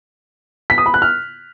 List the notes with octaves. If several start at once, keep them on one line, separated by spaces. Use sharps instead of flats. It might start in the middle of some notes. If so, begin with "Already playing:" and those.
B6
D#6
B5
F#6
F6